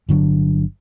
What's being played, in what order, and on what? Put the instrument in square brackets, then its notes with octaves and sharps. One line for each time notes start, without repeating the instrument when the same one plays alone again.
[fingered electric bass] G1 D3 F#3 D4